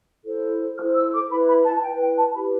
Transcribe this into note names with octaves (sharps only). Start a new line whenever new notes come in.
E4 A4 C5
E4 A4 C5 F6
E6
D6
E4 B4 B5
B5
A5
A5
E4 B4 G5
G5
A5
E4 G4 B4 B5